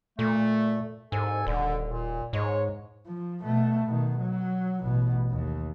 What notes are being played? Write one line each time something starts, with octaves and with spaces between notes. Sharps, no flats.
A#2 A3
C2 G#2 A4 G#5
D#1 D3
A#2
G#2 G#3 C#5
F3
B2 A3
B2 D#3
F#3
A1 B2
D#2